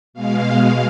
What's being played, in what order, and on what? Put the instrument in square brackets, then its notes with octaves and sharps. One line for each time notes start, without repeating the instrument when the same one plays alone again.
[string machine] B2 G#3 F5